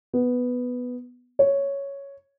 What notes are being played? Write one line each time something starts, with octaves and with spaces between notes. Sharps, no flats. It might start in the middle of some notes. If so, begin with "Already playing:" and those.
B3
C#5